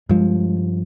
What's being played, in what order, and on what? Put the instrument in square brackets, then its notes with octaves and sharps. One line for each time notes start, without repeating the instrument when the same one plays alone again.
[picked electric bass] G2 F3 [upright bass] G#3